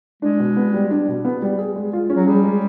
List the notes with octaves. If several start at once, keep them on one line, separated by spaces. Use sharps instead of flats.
G#3 D4
B2
B3
G3
D4
B2
B3
G3
G#4
G#3
F4
C#4
F#3
G3 G#4
G#3